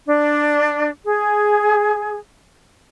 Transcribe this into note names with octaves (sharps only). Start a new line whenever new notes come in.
D4
G#4